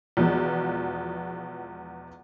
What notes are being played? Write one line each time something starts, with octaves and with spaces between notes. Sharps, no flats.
E2 B2 F3 G#3 B3